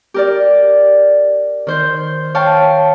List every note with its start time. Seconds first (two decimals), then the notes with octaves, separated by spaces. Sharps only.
0.14 G4 A#4 D5
1.67 D#3 C5 G6
2.35 C#5 F5 G5 A5